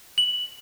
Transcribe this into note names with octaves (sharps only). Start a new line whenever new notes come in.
F#7